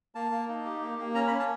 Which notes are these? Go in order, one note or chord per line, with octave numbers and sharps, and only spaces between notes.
A#3 A5
A#3
D#4
G4
A#3
A#3
C#4 A#5
B5
C#4
A5